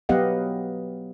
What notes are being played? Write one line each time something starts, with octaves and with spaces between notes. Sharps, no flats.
F#3 B3 G4 D#5 F5 F#5